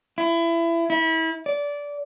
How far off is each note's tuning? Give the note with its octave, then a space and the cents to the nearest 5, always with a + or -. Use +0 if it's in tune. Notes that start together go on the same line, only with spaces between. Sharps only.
E4 +25
E4 -30
D5 -20